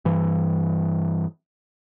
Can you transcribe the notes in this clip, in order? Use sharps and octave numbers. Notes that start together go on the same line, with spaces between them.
G2 E3